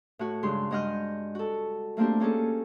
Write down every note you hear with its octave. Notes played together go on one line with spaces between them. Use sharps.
A2 F#4
G2 C#3 G#3 C6
G2 G#3 D#5 F#5 F6 G6
F#4 A4
A3 A#3 C4 D4 G4
A#3 C#4 G#4 A4